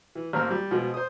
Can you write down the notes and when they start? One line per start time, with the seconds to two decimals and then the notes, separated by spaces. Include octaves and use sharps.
0.15 E3
0.33 A1 A#3 C4 C6 F6
0.51 G3
0.71 B2 F3 G#3
0.94 C5 D#6